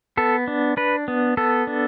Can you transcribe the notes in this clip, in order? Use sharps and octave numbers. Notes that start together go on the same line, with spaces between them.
B3 A4
D4
D4 B4
B3
B3 A4
D4